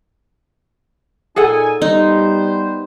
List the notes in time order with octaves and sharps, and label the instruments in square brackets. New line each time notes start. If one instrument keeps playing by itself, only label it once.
[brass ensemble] A#2 D#4 G#5 [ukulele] G#4 A4 F#5
[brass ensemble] G3 B3 C5 [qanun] D#4